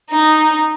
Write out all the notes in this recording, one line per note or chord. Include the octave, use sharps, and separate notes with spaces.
D#4